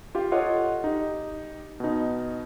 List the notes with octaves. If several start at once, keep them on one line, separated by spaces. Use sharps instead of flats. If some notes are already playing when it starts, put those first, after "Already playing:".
F4 G4 F5
F4 A4 C#5 D#5 F#5
D#4 G4
B2 D#4